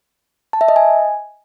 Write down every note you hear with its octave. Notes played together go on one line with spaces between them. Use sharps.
A5
E5
D#5
G#5